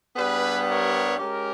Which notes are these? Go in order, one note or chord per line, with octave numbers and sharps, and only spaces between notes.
G2 G3 B3 G#4 B4
A#4 C#5
G#3 C#4 G4 A#4